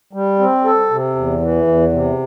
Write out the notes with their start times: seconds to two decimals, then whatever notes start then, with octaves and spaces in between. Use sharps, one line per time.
0.13 G3
0.39 C4
0.65 A4
0.91 C3
1.16 E2
1.41 E3
1.67 E2
1.92 C3